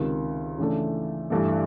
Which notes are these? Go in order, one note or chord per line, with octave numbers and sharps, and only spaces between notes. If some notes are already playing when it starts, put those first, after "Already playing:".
Already playing: C#2 C3 D#3
C#3 E3 A3 D4
G2 E3 A3